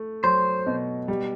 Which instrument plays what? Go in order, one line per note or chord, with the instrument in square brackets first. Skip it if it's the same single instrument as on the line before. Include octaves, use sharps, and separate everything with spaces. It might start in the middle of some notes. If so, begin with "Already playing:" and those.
Already playing: [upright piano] A3
[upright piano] F#3 [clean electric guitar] C5
[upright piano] B2
G3